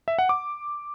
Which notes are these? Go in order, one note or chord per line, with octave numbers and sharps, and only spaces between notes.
E5
F#5
D6